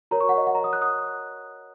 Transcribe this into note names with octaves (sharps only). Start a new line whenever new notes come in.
F#4 A#4 C#5 A#5
C#6
F#5
D#5
F#5
A#5
D#6
F#6
D#6